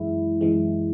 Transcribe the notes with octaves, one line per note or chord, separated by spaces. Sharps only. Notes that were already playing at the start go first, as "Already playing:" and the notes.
Already playing: F#2 E3 G#3 E4
F#2 E3 G#3